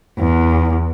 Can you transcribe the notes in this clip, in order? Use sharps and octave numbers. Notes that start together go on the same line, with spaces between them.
E2